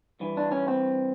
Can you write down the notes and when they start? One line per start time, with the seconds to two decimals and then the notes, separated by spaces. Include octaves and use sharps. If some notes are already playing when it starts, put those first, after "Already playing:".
0.20 G2 E3
0.37 D4
0.52 C#4
0.68 C4